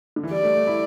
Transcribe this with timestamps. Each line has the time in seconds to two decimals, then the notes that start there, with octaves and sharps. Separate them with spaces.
0.16 D3
0.23 E3
0.31 G3 D5
0.43 A3
0.55 A3
0.67 E4